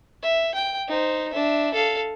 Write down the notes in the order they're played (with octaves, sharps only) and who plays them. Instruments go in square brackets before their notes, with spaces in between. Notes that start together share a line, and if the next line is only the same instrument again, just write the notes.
[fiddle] E5
G5
D#4 C5
D4 E5
A4 F5